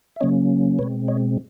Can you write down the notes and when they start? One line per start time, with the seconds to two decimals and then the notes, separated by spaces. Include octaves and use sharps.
0.16 E5
0.21 C#3 F#3 A#3 C#4 C#5 D#5
0.79 B2 G#3 C4 B4 C#5
1.08 C#5 D#5